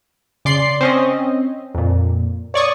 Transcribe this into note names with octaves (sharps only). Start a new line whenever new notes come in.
C#3 D5 C6 C7
C4 C#4 D#5
F2 A#2
C#5 D5 C#6 D#6